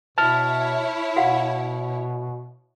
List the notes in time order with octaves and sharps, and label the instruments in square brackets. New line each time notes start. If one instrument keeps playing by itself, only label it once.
[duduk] B2 [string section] E4 C#5 [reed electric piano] A5 F6
[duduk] B2 [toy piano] F#4 F5 F#5